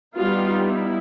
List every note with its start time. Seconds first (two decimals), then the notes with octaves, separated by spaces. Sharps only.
0.16 G3 B3 D#4 F4
0.63 E4